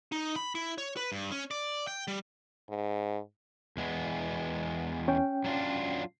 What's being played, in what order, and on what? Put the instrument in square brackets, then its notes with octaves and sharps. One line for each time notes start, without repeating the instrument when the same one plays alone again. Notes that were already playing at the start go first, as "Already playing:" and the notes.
[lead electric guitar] D#4
B5
E4
C#5
B4
G2
C#4
D5
G5
G3
[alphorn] G#2
[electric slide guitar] E2 G#3 B3
[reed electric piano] C#4 G5
[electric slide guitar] F#3 D4 F4